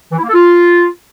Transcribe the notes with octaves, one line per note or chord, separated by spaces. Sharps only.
E3
E4
A#3
A4
F4